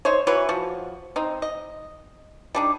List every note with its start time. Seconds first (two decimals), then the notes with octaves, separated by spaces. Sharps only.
0.05 D#4 C5 C#5
0.27 E3 F#3 B4 C#5
0.49 F3 F#4
1.16 C4 D#4
1.42 D#5
2.55 G3 D4 D#4